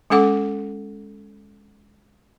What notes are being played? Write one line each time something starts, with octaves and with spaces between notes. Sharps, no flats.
G#3 C#4 A4 F#5 D6